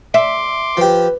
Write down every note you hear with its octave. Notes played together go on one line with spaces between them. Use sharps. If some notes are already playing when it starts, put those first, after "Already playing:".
E5 C6 D6
F3 G4 B4